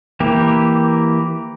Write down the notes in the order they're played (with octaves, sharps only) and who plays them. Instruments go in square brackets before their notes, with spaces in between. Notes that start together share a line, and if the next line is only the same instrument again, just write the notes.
[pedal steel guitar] E3 A#3 G4